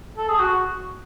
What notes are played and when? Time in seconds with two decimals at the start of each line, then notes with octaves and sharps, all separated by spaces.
0.18 A4
0.29 G#4
0.39 F#4